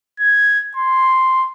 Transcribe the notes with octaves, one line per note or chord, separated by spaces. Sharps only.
G#6
C6